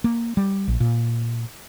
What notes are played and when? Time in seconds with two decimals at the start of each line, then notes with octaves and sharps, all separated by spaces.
0.04 A#3
0.37 G3
0.68 A#1
0.80 A#2